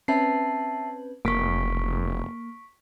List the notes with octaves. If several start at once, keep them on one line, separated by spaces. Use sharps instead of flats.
C4 C#4 B4 E5 A5 C7
F1 A#3 C#6 B6 D7